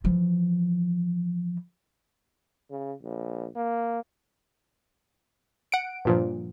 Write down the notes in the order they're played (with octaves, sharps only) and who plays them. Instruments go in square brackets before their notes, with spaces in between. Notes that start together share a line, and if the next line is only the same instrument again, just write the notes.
[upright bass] E3 F3
[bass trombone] C#3
A#1
A#3
[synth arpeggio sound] F#5 D7
G2 A#2 F3